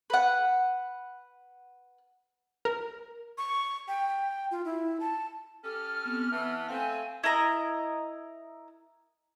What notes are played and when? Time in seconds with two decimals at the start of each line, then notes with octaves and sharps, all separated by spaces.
0.10 B4 F#5
2.65 A#4
3.38 C#6
3.88 G5
4.51 F4
4.65 E4
5.00 A5
5.64 C#4 G4 A4 F6
6.05 B3 C4
6.32 E3 B3 A5
6.68 A3 C4 F5 G#5
7.24 E4 A#4 D#5 A#5